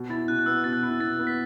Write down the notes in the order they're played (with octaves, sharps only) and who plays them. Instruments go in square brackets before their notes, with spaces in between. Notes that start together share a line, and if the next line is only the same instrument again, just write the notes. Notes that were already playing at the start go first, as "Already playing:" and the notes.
Already playing: [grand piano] B2
[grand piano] E4 [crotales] A6
[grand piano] B2 [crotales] F#6
[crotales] F#6
[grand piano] B3 [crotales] E6
[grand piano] B2 [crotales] A6
[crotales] F#6
[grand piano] E4
[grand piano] B2 [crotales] A6
[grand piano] B3
[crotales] B6